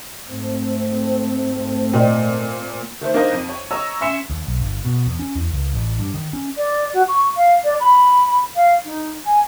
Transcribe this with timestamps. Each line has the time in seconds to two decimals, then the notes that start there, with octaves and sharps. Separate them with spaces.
0.28 G#2 A3 C4
1.93 A#2 D5 D#5 G5
3.01 D#3 A3 C5
3.14 A#3 D4 D#4 A#4 C5 D#5
3.32 F2 D#7
3.49 C#5
3.71 C#5 D#5 A#5 E6
4.01 C#4 E5 C6 C#7 E7
4.30 D#2
4.47 B1
4.60 G1
4.85 B2
5.06 E2
5.19 C#4
5.35 E2
5.52 C#2
5.74 A1
5.99 G2
6.14 D#3
6.33 C#4
6.56 D5
6.93 F#4
7.08 C#6
7.36 F5
7.64 D5
7.80 B5
8.55 F5
8.85 D#4
9.25 G#5